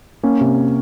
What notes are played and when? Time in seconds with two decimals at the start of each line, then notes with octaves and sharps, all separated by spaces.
0.23 A#3 C#4
0.41 C3